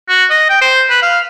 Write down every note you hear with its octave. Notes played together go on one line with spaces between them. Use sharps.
F#4
D#5
G5
C5
B4
F5